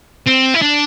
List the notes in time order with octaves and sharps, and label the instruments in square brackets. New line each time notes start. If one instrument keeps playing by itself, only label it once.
[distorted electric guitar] C4
E4
D4